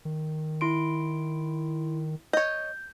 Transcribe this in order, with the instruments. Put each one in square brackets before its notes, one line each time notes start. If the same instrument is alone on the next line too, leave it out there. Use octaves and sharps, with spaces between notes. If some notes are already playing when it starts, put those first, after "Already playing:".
[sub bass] D#3
[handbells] E4 C6 D7
[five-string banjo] C#5 D#5 [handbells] G6